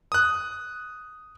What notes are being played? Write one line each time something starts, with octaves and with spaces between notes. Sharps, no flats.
D#6 F#6